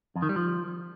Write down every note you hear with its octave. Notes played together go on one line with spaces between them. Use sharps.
F2
D#3
G3
F3